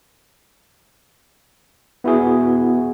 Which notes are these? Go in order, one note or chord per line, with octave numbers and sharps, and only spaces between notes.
B3 E4 F#4 G#4